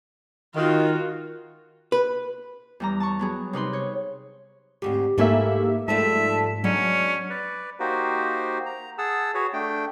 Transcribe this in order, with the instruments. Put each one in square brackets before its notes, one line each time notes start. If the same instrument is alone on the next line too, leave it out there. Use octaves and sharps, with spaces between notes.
[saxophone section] D#3 [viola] F4 F#4
[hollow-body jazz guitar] B4
[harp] E2 G3 A#5
A5 A#5 C#6
F#3 B3 G#4
C3 D#4 B4 C6
C#5
[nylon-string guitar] D2 G#2 C4 [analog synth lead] G4
[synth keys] G#2 A#3 E5 [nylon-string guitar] A3 E4 G#5
[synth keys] G#2 [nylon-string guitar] F3 G3 A3 [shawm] E5 [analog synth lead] A5
[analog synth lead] F#3 [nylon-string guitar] G#3 B3 D4 [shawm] C#4
[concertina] B4 D5
A#3 D#4 F#4 G4 C5
A#5
G#4 F#5 A5 E6
F#4 G#4 B4 C#5
A3 D4 G5